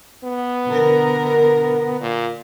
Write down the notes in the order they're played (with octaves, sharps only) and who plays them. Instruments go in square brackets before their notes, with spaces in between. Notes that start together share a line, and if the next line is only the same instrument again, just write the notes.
[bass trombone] B3
[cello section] B2 D3 A#4
[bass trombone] A#2